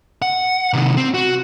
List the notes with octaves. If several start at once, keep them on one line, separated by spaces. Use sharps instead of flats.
F#5
C3 D#3
C4
F#4